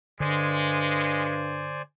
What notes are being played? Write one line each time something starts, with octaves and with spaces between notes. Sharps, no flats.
G2 D3 G#3 C5 D5 G#5